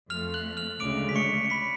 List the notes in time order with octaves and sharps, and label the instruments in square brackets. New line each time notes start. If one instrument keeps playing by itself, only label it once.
[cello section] F2 F3 A3 [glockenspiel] F6 F7
[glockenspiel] F#6 F#7
F6 F7
[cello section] D2 C#3 G#3 [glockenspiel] D6 D7
[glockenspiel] B6
C#6 C#7
B5 B6